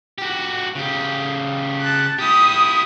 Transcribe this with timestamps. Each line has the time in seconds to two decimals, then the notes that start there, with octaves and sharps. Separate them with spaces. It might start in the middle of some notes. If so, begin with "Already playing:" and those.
0.18 F#4 G4
0.75 C#3 G4
1.81 A5 F#6
2.19 E4 G4 D#6